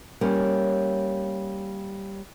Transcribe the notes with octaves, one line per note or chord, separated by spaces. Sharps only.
G3 A#3 C#4